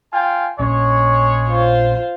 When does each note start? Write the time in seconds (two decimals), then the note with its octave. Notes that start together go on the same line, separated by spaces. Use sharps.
0.13 F4 G5 G#5
0.59 A#1 G#3 C#4 C#5
1.49 F4 C5